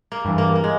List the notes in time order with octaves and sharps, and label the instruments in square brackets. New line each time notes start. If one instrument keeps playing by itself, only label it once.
[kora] A#3
[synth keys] G2 E3
[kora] A#3
A#3
G#3